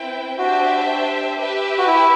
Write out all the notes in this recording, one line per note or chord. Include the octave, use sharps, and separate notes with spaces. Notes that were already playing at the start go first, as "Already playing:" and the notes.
Already playing: C4 E4 B4 E5 G5
D4 F#4 G4 C5 E5 G5
G4 B4 E5
F#4
E4